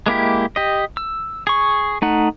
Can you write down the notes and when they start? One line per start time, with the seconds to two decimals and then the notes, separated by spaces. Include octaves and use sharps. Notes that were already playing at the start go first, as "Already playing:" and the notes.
0.06 G#3 A#3 E4 G4
0.56 G4 D#5
0.97 E6
1.47 G#4 C#6
2.02 A3 D#4 F#5